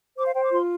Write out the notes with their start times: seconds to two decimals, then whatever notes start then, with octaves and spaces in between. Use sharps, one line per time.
0.17 C5 D6
0.26 F5
0.35 C5 G5
0.43 D6
0.52 F4 C6